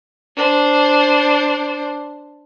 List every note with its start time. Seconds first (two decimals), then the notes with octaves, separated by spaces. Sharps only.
0.37 D4 C5